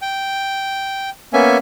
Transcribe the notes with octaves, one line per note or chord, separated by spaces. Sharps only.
G5
A#3 B3 C#4 E5 G#5